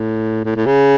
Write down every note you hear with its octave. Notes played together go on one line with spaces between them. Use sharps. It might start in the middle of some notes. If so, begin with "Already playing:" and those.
Already playing: A2
A2
A2
C#3